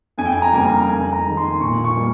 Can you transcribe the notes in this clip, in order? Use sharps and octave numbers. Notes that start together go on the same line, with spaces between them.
F2 G#5
G5
G#5
A#5
C#3 G3 A#3 G#5
A#5
F2 G#5
A#5
D#3 G#3
C6
A#2 C#6
C#6
G3 A#3